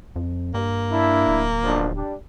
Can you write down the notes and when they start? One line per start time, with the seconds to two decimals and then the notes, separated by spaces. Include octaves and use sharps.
0.16 F2
0.54 G2 A#3
0.92 D4 E4
1.28 D1
1.63 B1 F3 D4
1.95 G3 D4